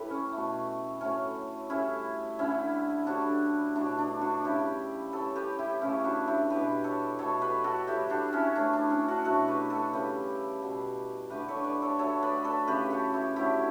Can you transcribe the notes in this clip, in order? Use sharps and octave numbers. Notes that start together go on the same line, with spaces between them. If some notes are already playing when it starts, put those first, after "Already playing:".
Already playing: A2 G3 E4 G4 B4
C#4
B2 A3
A2 F#3 A3 C#4
A2 G3 C#4 E4
D3 G3 C#4 E4
A2 G3 D4 F#4
B2 F#3 A3 D4
D4
D4 F#4
C#3 G3 E4 G4
A2 E3 G3 A4 C#5
G4 B4
E4 G4
C#3 E3 A3 C#4 E4
D4 F#4
E4 G4
B2 G3 G4 B4
A4 C#5
B2 F#3 A3 A4 C#5
G4 B4
F#4 A4
A2 G3 E4 G4
D4 F#4
C#4 E4
A2 E3 A3 D4
D4
C#4
D4 F#4
B2 F#3 A3 F#4 A4
G4 B4
F#4 A4
C#3 E3 G3 G4 B4
B2 G3
D3 A3 G4 B4
A4 C#5
B4 D5
A4 C#5
D3 F#3 A3 A4 C#5
B4 D5
A4 C#5
C#3 E3 A3 G4 B4
F#4 A4
E4 G4
D3 F#3 A3 E4 G4